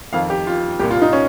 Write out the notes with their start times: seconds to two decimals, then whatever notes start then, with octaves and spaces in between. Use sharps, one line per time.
0.13 F2 D#3 F5
0.30 G4
0.47 F4
0.79 C2 A#2 G4
0.91 F4
1.02 D#4
1.13 C#4